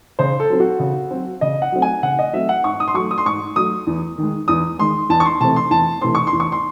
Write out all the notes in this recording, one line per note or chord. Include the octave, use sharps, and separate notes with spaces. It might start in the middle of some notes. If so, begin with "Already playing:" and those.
C#3 C5
A4
F#3 C4
F#4
C#3
F#3 C4
C#3 D#5
F#5
F#3 A3 C4
G#5
C#3 F#5
D#5
F#3 A3 C4 E5
F#5
G#2 C#6
D#6
C6
F#3 A3 C#6
D#6
C6
G#2 C#6
F#3 A3 D#6
E2
D#3 G#3
E2 D#6
D#3 G#3 C6
E2 A5
C#6
C6
C3 E3 A3 C4 A5
C6
E2 A5
C3 E3 A3 C4 C6
C#6
C6
E2
C#6
C6